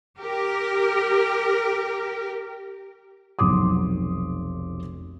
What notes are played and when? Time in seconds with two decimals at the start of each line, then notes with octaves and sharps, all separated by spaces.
0.18 G4 A#4
3.39 F1 B1 C6 D6 D#6